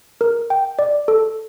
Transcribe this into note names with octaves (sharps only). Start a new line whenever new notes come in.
A#4
G5
D5
A4